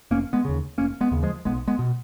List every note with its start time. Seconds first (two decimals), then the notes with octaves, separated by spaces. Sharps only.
0.11 F1 A#3 C#4
0.33 G#3 B3
0.45 D#2 C#3
0.78 F1 A#3 C#4
1.01 G#3 B3
1.11 D#2 C#3
1.23 F3 G#3
1.45 B1 G#3 B3
1.68 G#3 B3
1.79 B2